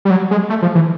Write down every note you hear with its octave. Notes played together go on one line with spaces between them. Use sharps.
G3
F#3
G#3
A3
F3
E3